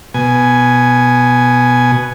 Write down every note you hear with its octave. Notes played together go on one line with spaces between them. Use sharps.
B2 G#5